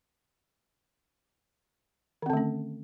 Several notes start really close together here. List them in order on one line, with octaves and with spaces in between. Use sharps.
D#3 C4 D3 A3 C#4